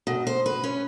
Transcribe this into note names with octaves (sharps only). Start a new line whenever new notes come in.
B2
C5
B4
C#4